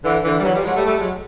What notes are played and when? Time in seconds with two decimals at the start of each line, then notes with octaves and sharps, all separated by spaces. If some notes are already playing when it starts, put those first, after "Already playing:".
0.04 D3 E3
0.24 D3 E3
0.40 G3
0.44 E3 F#3
0.54 F3 G3
0.65 F#3 G#3
0.75 G3 A3
0.85 G3 A3
0.99 F#3 G#3